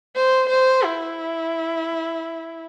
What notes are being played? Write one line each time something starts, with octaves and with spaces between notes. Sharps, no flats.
C5
C5
E4